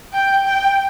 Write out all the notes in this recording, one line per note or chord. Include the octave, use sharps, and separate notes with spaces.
G5
G5